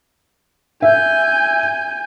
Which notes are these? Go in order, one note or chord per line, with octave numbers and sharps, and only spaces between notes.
E5 G#5 G6